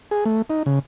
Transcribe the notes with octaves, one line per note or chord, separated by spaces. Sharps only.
G#4
A3
D#4
C#3